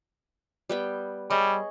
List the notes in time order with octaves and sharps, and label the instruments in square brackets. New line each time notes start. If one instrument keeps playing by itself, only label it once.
[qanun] G3 B3 G5
[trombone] G3 [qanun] G#4 C#5 D#5